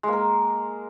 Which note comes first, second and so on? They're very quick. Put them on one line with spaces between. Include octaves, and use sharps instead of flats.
G#3 A#3 A#4